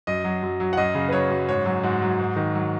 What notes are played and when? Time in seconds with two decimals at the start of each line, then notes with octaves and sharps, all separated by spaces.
0.07 F#2 D#5
0.24 F#3
0.43 F#2
0.60 F#3
0.73 F#5
0.77 F#2 D#5
0.95 C#3
1.09 B4
1.13 F#3 C#5
1.30 F#2
1.49 G#2 C#5
1.65 F#3
1.83 G#2 F#4
2.02 F#3
2.19 G#2
2.36 D#3
2.55 F#3